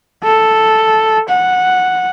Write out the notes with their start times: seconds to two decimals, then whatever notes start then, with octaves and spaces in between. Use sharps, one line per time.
0.23 A4
1.29 F#5